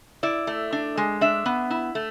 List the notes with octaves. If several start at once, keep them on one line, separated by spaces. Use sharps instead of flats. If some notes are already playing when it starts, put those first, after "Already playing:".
E4 D5
A3
D4
G#3
D4 E5
B3
E4
A3